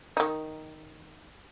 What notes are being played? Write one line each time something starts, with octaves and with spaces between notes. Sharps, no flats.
D#3 D#4